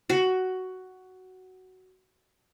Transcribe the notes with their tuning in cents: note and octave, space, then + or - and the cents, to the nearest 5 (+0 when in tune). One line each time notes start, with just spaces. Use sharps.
F#4 +10